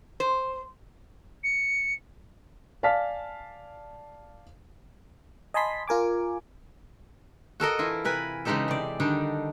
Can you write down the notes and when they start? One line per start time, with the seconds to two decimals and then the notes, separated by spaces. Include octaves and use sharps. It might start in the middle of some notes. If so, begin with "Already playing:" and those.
0.20 C5
1.44 C#7
2.83 D5 F5 G#5 A5 F6 B6
5.54 D#5 G#5 A5 B5 C6 B6
5.88 F4 A#4 G#5 D6
7.60 F#4 A4 A#4 D#5
7.79 E3 E4 F4
8.04 C3 A#4 B4 G#5
8.45 C#3 E3 G#3 D#4 G4 A4
8.68 C3 D5
9.00 D3 D#3 G3 D4 D#4